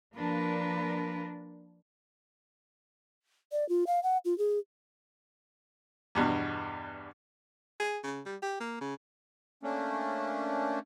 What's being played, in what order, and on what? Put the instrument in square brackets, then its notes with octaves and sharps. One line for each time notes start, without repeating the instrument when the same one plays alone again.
[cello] F3 B4 [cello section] A#3 D4 A#4
[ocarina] D5
F4
F5
F#5
F4
G#4
[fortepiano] E2 G2 B2
[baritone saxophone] G#4
C#3
G3
G4
A#3
C#3
[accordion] A3 A#3 C#4 D4